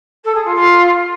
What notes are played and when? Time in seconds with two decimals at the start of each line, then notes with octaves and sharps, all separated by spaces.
0.24 A4
0.34 G#4
0.45 F4
0.55 F4